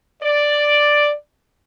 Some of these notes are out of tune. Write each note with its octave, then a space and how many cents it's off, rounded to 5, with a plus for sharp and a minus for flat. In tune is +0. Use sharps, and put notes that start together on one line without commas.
D5 +5